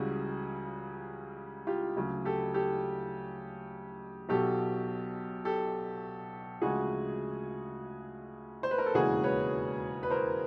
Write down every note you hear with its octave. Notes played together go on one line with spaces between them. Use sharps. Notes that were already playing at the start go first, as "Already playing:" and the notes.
Already playing: C#2 C#3 E3 G3 F#4 G#4
F4 G4
D2 C#3 F#3
G4 A4
G4 A4
B1 B2 F#3 G4 A4
G4 A4
D2 C#3 F3 G#3 F#4 G#4
C5
B4
A#4
A4
E1 D#2 C#3 E3 G#3 F#4 G#4
B4 C#5
B4
A#4 C5